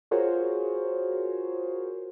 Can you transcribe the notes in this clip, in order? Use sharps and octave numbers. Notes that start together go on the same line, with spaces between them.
F4 F#4 G#4 A#4 C5 C#5